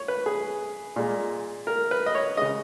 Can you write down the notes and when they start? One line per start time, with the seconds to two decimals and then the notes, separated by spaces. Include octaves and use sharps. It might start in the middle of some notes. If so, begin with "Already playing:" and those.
Already playing: C#5
0.08 B4
0.26 G#4
0.96 A#2 G#3
1.67 A#4
1.91 B4
2.06 D#5
2.15 C#5
2.37 C#3 G#3 D#5